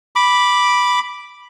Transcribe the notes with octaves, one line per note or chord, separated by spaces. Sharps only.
B5 D6